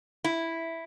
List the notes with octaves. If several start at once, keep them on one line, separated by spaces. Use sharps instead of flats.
E4